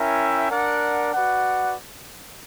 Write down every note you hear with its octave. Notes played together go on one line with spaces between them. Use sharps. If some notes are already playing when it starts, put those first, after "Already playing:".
Already playing: C#4 E4 A#4 E5 G5
D4 A#4 D5 F#5
F#4 B4 D5 F#5